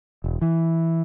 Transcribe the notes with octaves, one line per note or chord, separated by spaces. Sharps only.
E1
E3